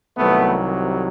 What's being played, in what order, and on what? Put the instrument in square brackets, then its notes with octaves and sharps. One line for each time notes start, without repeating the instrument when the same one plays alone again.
[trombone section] C2 C3 D#3 F#3 A3 B3